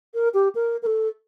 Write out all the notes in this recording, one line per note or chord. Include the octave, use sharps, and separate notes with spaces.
A#4
G4
A#4
A#4
A4